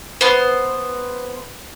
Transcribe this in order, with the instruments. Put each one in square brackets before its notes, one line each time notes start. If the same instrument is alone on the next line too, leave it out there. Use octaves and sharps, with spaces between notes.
[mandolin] B3 C5